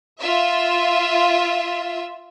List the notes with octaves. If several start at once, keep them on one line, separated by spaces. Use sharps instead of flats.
F4 E5